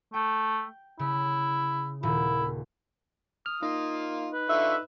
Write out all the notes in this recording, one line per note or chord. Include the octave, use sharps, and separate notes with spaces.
A3 G5
C#3 E4
D#1 A#2 E4
D#6 F6
A#3 D#4 F4 D#5
B4
D3 F4 E5 C#6